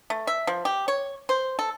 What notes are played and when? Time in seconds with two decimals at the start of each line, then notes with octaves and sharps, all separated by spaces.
0.10 A3
0.27 E5
0.47 F3
0.65 G4
0.88 C#5
1.29 C5
1.59 A4